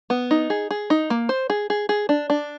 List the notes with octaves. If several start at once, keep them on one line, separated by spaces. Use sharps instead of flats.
B3
D#4
G#4
G#4
D#4
A#3
C5
G#4
G#4
G#4
D4
D4